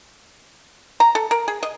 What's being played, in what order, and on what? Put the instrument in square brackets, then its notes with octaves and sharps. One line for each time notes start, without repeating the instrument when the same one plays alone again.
[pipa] A#5
A4
A#4
G#4
D#5